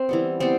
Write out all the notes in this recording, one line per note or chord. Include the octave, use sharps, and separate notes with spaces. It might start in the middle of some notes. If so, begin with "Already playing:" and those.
Already playing: C4
E3 G3 B3
G3 B3 C4